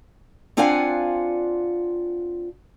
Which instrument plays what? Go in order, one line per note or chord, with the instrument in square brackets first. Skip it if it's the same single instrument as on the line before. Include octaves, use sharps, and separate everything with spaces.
[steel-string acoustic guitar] C4 D4 F4 F5 F#5 G#5